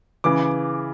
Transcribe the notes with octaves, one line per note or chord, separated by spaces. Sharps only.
C#3 E3 D6